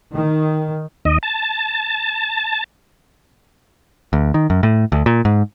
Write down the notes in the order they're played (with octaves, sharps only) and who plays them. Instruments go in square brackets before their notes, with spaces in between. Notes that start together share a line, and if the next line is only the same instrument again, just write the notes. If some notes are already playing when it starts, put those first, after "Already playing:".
[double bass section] D#3
[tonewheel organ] D#2 D#5
A5
[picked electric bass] D2
D#3
F#2
A2
D2
A#2
G#2